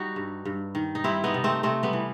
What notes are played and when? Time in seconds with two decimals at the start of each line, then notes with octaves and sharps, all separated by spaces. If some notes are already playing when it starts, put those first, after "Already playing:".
Already playing: G3 D#4 F#4
0.16 G2
0.45 G2
0.75 D#3
0.95 D#4
1.04 G3 C4 E4
1.24 B3 D#4
1.34 C3
1.44 A3 C4
1.63 C3 A3 C4
1.83 G3 B3
1.93 E3